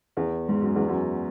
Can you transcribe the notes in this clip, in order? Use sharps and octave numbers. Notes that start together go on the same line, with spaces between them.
E2
G#2
F#2
E2
F#2